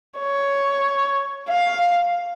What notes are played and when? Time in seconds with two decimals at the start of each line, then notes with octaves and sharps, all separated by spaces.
0.18 C#5
1.48 F5